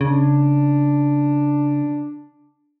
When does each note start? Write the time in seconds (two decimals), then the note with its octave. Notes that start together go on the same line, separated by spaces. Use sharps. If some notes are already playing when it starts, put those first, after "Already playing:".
0.01 C#3 D4